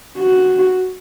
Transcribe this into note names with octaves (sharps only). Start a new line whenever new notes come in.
F#4